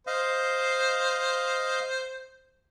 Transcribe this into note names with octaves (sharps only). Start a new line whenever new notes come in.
C5 D#5 F5